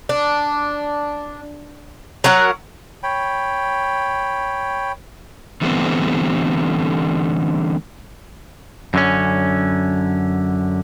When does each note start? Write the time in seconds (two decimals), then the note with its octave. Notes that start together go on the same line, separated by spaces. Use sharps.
0.09 D4
2.24 F#3 A#4 F#5
3.03 C#5 G5 B5
5.62 D3 E3 G3 A3 B3 C4
8.94 F#2 D3 C#4